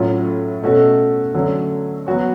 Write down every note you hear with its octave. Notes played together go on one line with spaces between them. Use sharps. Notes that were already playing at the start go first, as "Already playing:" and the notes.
Already playing: A2 F#3 C#4 F4
B2 A3 C#4 F#4 A4
D3 F#3 A3 C#4
F#3 B3 F#4 C#5